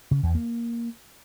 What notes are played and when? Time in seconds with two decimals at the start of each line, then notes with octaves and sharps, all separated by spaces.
0.11 C#3
0.23 E2
0.35 A#3